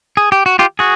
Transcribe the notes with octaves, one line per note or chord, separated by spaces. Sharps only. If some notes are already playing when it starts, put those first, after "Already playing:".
G#4
G4
F#4
F4 G4
F#4 G#4